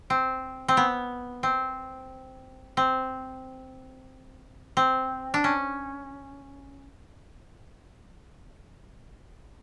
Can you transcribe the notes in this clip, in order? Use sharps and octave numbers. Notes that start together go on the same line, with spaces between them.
C4
C4
B3
C4
C4
C4
D4
C#4